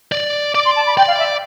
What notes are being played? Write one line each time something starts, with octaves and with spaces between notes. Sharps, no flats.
D5
D5 D6
C6
A5
B5
D5 G5
F5
E5